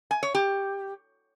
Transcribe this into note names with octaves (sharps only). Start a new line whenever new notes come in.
G#5
C#5
G4